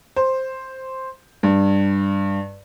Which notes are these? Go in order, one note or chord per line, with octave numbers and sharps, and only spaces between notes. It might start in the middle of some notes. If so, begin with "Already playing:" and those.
C5
G2